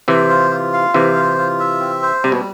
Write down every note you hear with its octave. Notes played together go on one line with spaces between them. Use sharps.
C3 E3 C5
F4
F4
F5
C3 E3 C5
F4
F4
E5
C4
C5
C3 G3
B2